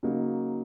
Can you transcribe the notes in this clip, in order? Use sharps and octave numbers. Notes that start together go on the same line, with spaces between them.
C#3 F#3 A#3 D#4